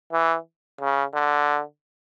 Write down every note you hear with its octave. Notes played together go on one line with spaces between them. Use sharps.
E3
C#3
D3